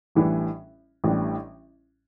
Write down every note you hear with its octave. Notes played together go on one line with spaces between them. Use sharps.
A1 A2 E3 G3 D4
A1 A2 E3 G3 D4